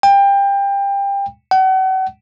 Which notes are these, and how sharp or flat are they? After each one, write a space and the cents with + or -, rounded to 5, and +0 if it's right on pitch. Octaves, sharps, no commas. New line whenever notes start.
G5 +25
F#5 +40